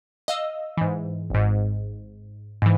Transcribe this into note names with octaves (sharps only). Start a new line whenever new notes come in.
D#5 F5 E6
G#2 E3
G#1 G#2
G#2 E3